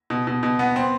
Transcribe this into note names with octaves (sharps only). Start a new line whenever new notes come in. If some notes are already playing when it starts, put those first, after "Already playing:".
B2
B2
B2
B3
C4